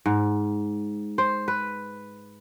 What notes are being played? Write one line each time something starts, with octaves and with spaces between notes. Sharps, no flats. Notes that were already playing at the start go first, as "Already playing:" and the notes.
G#2
C5
B4